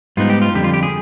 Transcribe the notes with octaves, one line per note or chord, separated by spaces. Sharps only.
G#2 G3 B3 D#4 F4
G4
F4
F2 D3 G3 G4
F4
G4
G#4